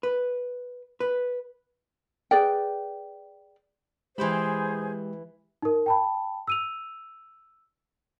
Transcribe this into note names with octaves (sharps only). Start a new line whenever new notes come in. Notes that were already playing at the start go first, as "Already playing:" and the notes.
B4
B4
G#4 B4 D5 G5
E3 G#3 G4 G#4 C5 G5 B5
D#4 A#4
G5 A5 B5
E6 D#7 F7